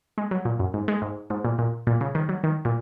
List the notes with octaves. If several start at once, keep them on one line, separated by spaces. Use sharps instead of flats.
G#3
F#3
A#2
F#2
G#2
G#3
G#2
G#2
A#2
A#2
A#2
C#3
D#3
F#3
D#3
A#2